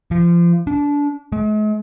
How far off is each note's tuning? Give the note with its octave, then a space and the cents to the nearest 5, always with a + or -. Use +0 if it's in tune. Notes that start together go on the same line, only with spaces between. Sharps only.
F3 -25
D4 -25
G#3 +45